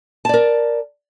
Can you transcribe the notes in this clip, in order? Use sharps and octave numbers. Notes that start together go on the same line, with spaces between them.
A#4 D5 A5